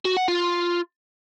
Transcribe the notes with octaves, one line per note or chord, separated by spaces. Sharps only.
F#4
F#5
F4